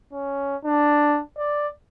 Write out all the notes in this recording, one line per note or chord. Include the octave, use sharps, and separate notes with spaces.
C#4
D4
D5